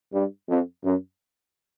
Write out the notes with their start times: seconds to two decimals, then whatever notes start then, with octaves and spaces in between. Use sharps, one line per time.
0.13 G2
0.49 F2
0.84 F#2